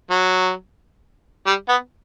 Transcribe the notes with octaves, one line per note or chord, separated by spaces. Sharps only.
F#3
G3
B3